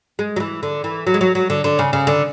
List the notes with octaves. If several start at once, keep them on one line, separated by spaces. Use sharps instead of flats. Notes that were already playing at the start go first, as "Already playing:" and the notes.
G#3
F#3
E3
D3
E3
F#3
G#3
F#3
F#3
D3
D3
C#3
C#3
D3